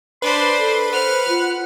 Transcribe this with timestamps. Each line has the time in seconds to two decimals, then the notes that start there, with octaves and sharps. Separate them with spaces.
0.22 D4 B4 C5 B5 C6
0.59 A4
0.93 C5 F#5 F6
1.29 F4